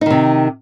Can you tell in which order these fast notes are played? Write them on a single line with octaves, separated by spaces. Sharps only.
D#4 D#3 C3